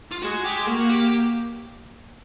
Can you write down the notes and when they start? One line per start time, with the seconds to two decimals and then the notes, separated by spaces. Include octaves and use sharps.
0.12 F4
0.22 G#3 F#4
0.44 G4
0.67 A#3 F#4
0.90 G4